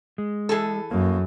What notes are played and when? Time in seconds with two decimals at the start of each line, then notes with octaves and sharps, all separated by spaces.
0.18 G#3
0.49 E3 G#4 A4
0.91 F#2 A#3